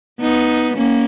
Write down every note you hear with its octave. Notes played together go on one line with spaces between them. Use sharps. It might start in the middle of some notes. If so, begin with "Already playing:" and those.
B3 D#4
A#3 C#4